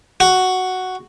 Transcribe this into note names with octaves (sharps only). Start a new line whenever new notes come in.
F#4